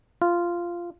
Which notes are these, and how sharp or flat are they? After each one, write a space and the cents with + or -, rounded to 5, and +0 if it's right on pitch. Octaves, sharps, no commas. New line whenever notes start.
F4 -10